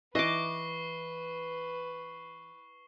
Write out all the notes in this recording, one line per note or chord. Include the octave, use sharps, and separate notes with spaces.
E3 B4 D#5 C#6 D6 C7 G7